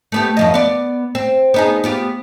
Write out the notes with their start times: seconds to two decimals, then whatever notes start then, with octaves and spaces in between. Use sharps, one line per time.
0.12 A3 B3 G4
0.37 F#2 F3 D#5
0.54 B3 D5
1.15 C4
1.54 B3 D#4 G#4
1.84 B3 F4 G4